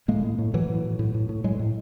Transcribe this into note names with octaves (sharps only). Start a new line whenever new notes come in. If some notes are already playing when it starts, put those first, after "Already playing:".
A2 G#3 A#3
A2
A2
A2 E3 F#3
A2
A2
A2
A2
A2
A2 F#3 G#3
A2